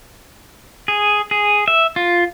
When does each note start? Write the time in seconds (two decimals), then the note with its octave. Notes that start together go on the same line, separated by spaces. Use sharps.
0.88 G#4
1.31 G#4
1.68 E5
1.96 F4